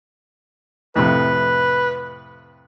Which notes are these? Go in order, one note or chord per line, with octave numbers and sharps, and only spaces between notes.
F2 A2 C3 B4